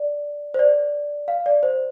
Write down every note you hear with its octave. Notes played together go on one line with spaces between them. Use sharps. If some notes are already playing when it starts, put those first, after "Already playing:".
Already playing: D5
C5
D5
F5
D5
C5